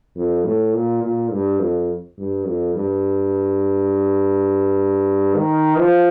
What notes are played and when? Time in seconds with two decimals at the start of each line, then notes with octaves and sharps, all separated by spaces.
0.16 F2
0.45 A2
0.74 A#2
1.03 A#2
1.32 G2
1.60 F2
2.18 G2
2.47 F2
2.75 G2
5.36 D#3
5.79 F3